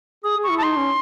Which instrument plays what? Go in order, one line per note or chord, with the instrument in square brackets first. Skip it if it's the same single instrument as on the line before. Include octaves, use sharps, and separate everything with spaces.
[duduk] G#4 [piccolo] D#6
[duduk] G#4
[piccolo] C#6
[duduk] E4
[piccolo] A5
[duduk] D#4 [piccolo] C6
[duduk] C#4